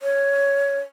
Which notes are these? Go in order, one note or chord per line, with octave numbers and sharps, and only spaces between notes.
C#5